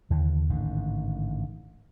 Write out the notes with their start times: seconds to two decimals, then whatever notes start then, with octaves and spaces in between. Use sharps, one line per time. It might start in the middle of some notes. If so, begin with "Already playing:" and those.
0.10 D#2 D3 E3
0.49 A1 G#2 D3 D#3